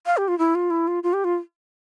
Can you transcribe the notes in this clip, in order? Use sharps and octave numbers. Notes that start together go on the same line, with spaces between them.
F5
G4
F4
E4
F4
E4
F4
F4
G4
F4